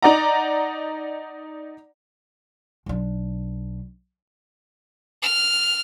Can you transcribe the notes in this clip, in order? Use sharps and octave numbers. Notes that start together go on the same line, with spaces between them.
D#4 D5 F#5 A#5
B1 D4
F6